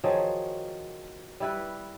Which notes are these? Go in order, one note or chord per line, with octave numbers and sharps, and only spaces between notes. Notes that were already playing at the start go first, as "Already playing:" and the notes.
D#3 F3 F#3 G#4
G3 E4 B4